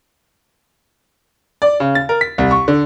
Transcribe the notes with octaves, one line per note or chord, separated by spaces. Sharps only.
D5
C#3
A6
A#4
B6
C2
C#6
D3